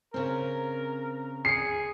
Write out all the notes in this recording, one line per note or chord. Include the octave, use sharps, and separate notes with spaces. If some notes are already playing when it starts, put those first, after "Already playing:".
C#3 C4 A#4
G#4 C7 C#7